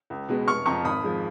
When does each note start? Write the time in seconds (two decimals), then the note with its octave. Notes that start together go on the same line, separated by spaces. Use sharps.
0.10 C#2
0.29 B2 G#3 B3
0.47 F1 C#6 F6
0.66 F2 F3 A#5 C#6
0.85 G#1 B5 D#6
1.04 F3 G#3